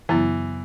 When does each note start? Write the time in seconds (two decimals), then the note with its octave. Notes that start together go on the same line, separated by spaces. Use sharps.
0.09 F#2 C#3 E3 F#3 B3